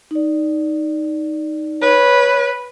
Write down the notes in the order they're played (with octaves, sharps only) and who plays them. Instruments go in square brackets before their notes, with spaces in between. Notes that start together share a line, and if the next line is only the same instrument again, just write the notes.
[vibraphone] D#4 D5
[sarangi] B4 [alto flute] C#5